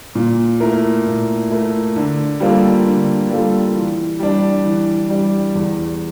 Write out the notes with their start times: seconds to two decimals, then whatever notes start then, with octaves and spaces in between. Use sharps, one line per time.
0.15 A#2
0.60 A3 E4 A#4
1.06 A#2
1.51 A3 E4 A#4
1.96 D3
2.40 G3 A#3 F4 A4
2.86 D3
3.30 G3 A#3 F4 A4
3.75 E3
4.20 G3 D4
4.65 E3
5.09 G3 D4
5.55 E2